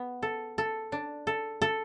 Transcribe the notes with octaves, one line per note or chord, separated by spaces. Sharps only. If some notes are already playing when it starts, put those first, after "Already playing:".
Already playing: B3
A4
A4
D4
A4
A4